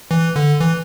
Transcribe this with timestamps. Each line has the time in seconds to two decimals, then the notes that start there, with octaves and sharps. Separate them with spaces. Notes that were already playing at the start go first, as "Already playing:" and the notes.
0.11 E3
0.36 D3
0.60 E3